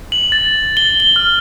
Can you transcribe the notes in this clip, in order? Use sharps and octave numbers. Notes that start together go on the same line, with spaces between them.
F#7
A6
G7
G7
F6